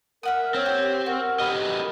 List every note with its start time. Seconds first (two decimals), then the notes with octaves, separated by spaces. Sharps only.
0.23 A#4 E5 F#5 D#6
0.55 C4 C#5
0.66 G4
1.06 F#4 A#4
1.40 G4 A#4 B4 D#5